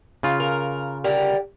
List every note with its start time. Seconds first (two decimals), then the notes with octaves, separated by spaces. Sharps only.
0.23 C#3 F4
0.40 A#4
1.04 D3 G4 A#4